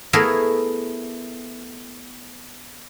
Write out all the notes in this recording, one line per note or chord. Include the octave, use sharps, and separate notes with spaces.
A3 B3 E4 G#4 A#4